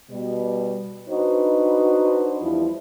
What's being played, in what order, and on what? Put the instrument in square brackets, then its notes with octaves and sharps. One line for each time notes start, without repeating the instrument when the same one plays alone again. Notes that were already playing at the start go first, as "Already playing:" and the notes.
[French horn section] B2 G3
D4 D#4 F#4 B4 C5
E2 F3 G3 E4